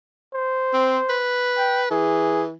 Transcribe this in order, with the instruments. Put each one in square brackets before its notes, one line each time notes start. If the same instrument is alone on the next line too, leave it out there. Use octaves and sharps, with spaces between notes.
[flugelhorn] C5
[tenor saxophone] C4
B4
[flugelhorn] G5
[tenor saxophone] E3 [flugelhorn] G#4